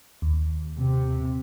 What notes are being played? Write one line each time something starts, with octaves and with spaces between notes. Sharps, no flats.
D#2
C3